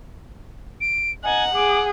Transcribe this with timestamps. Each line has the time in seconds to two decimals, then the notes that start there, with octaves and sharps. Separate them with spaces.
0.81 D7
1.24 D#4 F#5 G#5
1.55 G#4 D6